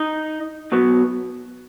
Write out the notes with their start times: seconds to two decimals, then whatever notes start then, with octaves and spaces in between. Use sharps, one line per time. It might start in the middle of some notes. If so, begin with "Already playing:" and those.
Already playing: D#4 D#5
0.72 B2 F#3 B3